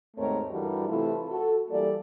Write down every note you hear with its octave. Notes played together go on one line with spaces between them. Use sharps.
D#2 G#2 A3 C4 A#4 C#5
G2 E3 G3 F#4 A4 A#4
C3 E3 A3 E4 F4 A4
F#4 A4
E3 G3 A#3 A4 D5